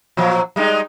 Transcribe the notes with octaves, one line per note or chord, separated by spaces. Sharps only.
A#2 F3 F#3
G3 G#3 D#4